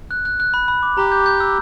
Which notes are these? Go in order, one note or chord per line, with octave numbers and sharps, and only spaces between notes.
F#6
F#6
F#6
B5
B5
D6
G4 A#5
G6
G6
E6